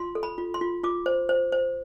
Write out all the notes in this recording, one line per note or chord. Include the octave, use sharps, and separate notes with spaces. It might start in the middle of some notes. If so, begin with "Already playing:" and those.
Already playing: F4 C6
A4
B5
F4
C6
F4
F4 D6
C5
C5
C5